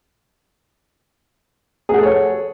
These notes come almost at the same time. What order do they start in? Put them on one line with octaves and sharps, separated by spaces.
G#4 F#5 A4 C#5